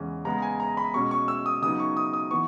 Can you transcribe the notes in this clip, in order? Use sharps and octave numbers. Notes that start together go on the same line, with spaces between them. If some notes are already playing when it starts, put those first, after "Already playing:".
Already playing: E2 C#3 G#3 C#4
C#3 G#3 B3 A#5
G#5
A#5
B5
B2 G#3 C#4 C#6
C#6
E6
D#6
C#3 F#3 B3 D#4 D#6
C#6
D#6
D#6
E3 B3 C#6